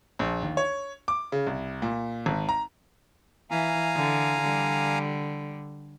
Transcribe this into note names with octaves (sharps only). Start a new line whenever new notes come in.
A#1
D#2
C#5
D6
C#3
C2
A#2
G#1
A#5
E3 F5 G#5 A#5
D3
D3 G3